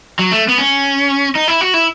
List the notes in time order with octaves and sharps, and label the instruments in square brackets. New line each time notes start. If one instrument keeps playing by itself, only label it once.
[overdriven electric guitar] F#3
A3
B3
C#4
D#4
E4
F#4
E4